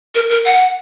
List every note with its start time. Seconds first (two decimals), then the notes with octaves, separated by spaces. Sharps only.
0.15 A#4
0.30 A#4
0.45 F#5